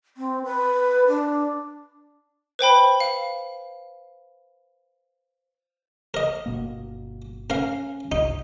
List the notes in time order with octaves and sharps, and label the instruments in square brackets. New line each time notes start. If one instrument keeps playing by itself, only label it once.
[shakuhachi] C4
B4
D4
[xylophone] B4 C5 G5 B5
F5
[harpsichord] A#4 D#5
[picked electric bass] G1 B2 A#3
[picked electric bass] C#4 [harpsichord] A#4 F5
[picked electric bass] G1 C2 [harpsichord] D#4